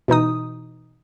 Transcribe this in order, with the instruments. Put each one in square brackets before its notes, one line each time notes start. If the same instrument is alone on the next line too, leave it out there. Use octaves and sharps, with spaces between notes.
[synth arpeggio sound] B2 E3 D#4 D#6